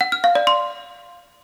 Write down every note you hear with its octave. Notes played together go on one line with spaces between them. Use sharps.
F#5
F6
F5
D5
C6